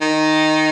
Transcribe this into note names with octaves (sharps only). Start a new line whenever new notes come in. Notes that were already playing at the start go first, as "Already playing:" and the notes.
D#3